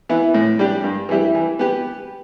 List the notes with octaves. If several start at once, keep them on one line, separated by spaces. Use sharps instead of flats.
E3 B3 E4
A2
G3 D4 G4
G2
E3 G3 E4 G4
E3
B3 G4